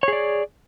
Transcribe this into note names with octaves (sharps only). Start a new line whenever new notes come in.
G#4 C#5 D5